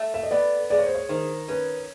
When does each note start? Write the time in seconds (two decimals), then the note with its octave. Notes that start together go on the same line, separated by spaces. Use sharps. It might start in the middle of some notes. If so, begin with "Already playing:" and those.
Already playing: A3
0.14 E5
0.23 D#5
0.31 B3 D5
0.70 G#3 D5
0.79 C#5
0.86 C5
0.95 C#5
1.09 D#3 C5
1.48 C#4 B4